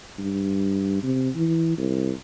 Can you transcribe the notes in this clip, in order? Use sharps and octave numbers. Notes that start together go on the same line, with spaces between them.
G2
C3
E3
C2